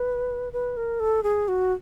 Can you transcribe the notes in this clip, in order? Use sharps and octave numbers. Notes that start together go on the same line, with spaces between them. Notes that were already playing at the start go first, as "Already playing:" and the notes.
Already playing: B4
B4
A#4
A4
G#4
F#4